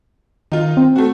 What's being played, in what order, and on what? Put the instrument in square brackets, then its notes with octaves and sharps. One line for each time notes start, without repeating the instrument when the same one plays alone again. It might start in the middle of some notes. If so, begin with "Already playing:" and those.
[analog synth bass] D#3 [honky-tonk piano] D#4 F4
[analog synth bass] C4
[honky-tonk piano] A3 F#4